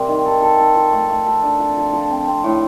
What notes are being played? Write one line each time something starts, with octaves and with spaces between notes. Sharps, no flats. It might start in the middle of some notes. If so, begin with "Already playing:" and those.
Already playing: C3 G3 A#3 C4
D#3
A4
A4
A4
F3
A3
A3
A4
D4
F3
F3
F3
C4
C4
A2